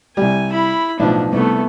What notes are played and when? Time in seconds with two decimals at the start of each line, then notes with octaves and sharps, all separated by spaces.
0.17 C2 G3 G#5
0.51 E4 B5
1.00 B1 A2 F3 D4
1.33 C2 A3 B3